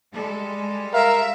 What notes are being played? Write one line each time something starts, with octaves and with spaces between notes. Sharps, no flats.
G3 G#3 A4
A#4 E5 F5